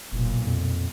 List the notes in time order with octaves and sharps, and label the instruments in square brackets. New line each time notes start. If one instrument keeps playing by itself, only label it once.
[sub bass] F1 [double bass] B1 A#2
[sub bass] F2